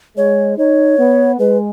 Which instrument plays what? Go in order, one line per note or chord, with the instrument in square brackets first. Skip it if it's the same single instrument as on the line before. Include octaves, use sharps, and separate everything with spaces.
[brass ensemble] G#3 [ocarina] C#5
[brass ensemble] D#4 [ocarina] C#5
[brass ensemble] B3
[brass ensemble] G#3 [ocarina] B4